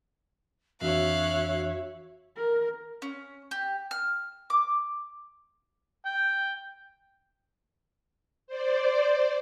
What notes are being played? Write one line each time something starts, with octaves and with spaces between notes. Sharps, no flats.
F2 E3 D4 F#4 C#5 E5 F5 F#6
A#4
C#4
G4
F6
D6
G5
C5 D5